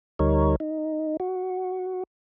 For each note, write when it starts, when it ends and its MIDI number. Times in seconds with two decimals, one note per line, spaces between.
0.19 0.56 38
0.19 0.56 55
0.19 0.56 63
0.19 0.56 70
0.19 0.56 73
0.60 1.17 63
1.20 2.03 66